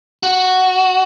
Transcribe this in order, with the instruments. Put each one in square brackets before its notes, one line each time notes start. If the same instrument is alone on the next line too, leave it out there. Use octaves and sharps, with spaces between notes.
[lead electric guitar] F#4